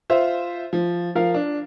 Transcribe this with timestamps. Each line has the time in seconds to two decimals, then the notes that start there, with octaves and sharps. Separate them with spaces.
0.10 F4 C5 E5
0.73 F3
1.15 F3 A#4 F5
1.35 D4